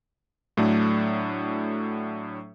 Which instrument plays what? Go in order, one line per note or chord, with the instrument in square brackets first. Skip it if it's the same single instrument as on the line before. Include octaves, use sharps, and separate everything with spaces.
[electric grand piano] A2 F#3 A3 D4